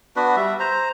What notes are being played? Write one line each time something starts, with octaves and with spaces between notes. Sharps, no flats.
B3 D4 F#4 B4
G3 E5
C5 A#5